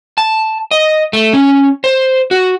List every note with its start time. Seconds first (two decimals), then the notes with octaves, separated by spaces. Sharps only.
0.18 A5
0.71 D#5
1.13 A3
1.33 C#4
1.84 C5
2.31 F#4